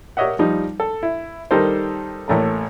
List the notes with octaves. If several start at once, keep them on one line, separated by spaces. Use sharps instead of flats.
G4 A#4 C#5 D#5 E5 F#5
F3 G3 D#4
A4
E4
D#3 G3 D#4 A4 A#4 C5
A1 A2 A3 A#3 A#5